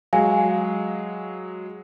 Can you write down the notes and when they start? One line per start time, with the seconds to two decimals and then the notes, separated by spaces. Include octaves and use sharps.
0.13 F#3 G#3 F5 G#5